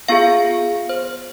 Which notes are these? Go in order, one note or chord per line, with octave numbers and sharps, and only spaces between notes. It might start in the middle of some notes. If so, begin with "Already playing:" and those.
B3 F4 G#4 F5
C5